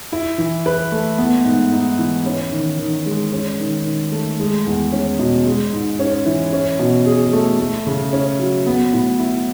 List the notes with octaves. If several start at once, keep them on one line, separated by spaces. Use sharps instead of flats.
E4
E3
B4
A3
B3
G#2
D#4
E3
C#4
D#3
D#3
G#3
C#4
D#3
D#3
A3
G#3
E2
C#4
B2
G#3
G#2
C#4
E3
C#4
B2
G#4
A3
A3
C#3
C#4
F#3
B3
A2
E4